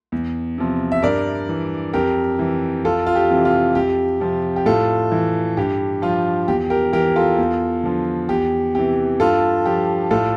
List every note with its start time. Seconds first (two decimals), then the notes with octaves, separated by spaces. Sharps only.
0.12 E2
0.58 C3 F3
0.92 E5
1.03 G2 A#4 D5
1.49 E3
1.93 F2 G4 A#4
2.39 E3
2.84 F2 F4 A4
3.07 F4
3.15 G4
3.30 C3 E3
3.45 F4
3.75 F2 G4
4.20 C3 F3
4.56 G4
4.66 A2 F4 A4
5.12 E3
5.57 G2 G4
6.02 F3 F4
6.48 E2 G4
6.70 G4 A#4
6.93 E3 G4 A#4
7.16 F4 A4
7.38 E2
7.84 D3 F3
8.29 E2 G4
8.75 C3 E3 G4
9.20 G2 F4 A4
9.66 F3 G4
10.11 A2 F4 A4